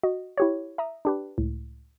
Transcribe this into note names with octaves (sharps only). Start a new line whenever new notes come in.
F#4 D#5
E4 G4 C#5
E5 A#5 D#6
D4 G4 B4
C#2 A2